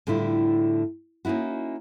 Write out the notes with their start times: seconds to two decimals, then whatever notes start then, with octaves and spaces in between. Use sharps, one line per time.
0.07 A2 D3 G3 E4 F4
1.25 A#3 C#4 D#4 E4 F#4